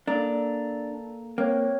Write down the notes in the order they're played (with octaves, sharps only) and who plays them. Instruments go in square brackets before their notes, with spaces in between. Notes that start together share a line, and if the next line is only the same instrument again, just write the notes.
[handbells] A#3 A4 A#5 [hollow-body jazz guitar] D4
[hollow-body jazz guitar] A#3 [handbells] C4 C#5